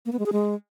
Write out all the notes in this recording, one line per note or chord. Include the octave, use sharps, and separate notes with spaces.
A#3
B3
G#3
G#4
G#3